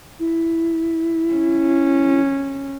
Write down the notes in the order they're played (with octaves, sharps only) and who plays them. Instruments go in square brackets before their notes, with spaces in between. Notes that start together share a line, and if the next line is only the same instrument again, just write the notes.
[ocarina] E4
[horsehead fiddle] C#4